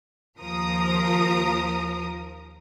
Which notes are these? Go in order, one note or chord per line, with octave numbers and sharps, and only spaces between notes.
D#2 F3 A#4 A#5 D#6